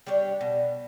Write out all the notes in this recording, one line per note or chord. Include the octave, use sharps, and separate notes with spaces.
G3 D4 G4 C#5
B2